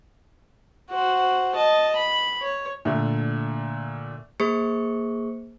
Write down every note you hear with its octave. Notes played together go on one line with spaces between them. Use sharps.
F#4 C5
D#5 A5
B5
C#5
A#2 D3 A3
A#3 G#4 C5 C#6 C#7